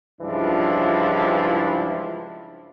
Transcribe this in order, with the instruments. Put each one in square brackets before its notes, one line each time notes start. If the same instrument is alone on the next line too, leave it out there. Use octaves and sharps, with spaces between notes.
[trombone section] C#2 G2 E3 F3 D4 E4